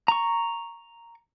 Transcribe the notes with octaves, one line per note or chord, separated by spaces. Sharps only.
A#5 C#6